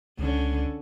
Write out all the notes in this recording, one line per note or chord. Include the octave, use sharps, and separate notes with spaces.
C#2 D3 C#4